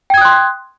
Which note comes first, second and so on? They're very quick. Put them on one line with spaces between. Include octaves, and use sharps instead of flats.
G5 G#6 D#6 F#6 C6